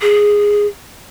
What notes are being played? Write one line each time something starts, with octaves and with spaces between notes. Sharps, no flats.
G#4